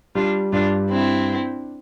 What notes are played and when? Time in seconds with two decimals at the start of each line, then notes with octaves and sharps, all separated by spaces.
0.15 G3 D4 F4
0.52 G2 D4 F4
0.90 C4 D4 E4